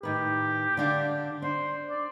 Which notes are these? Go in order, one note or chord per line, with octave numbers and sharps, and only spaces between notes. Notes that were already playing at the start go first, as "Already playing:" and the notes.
A2 D#3 G4 B4
D3 D4 F5
D4 C5
D5